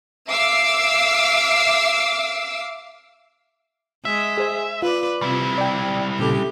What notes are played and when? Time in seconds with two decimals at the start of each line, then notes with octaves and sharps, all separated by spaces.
0.30 E5 F5 D6 E6 C7
4.05 G#3 E5
4.38 G#4 C5 G#5
4.82 F4 B4 D5
5.22 C3 G3 E4
5.58 D5 G5
6.19 A#2 C#3 G4 A4